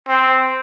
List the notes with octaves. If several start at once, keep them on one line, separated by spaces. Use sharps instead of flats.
C4